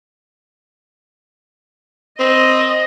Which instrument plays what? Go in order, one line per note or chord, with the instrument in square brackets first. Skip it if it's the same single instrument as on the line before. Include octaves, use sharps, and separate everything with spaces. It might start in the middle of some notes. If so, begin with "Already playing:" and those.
[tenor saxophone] C4 [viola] D#5